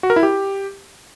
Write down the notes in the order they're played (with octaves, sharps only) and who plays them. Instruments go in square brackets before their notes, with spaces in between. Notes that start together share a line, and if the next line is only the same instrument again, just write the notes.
[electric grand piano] F#4
A#4
E4
G4